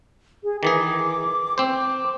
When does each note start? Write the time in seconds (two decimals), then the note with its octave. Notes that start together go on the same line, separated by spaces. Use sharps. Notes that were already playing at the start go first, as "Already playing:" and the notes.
0.44 G#4
0.63 D#3 E3 G#4 D6
1.58 C4 C5 D6